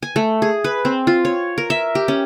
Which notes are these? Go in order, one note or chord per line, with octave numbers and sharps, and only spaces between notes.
G#5
A3
G#4
B4
C4
F4
C#5
A#4
E5
G4
C#4